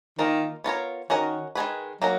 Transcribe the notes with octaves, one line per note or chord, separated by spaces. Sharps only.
D#3 A#3 F4 A#4 D#5
B3 F4 A#4 C#5
D#3 C#4 F#4 A#4 D#5
D#3 G#3 C#4 G#4 B4
F#3 A#3 D#4 A#4